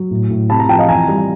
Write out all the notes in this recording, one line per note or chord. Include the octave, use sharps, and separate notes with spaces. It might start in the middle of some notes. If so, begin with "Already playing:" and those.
Already playing: F#3
A2
A2
C3 A5 B5
A#5
F3 G5 A5
D#5 F5
E3 G#5 A#5
G3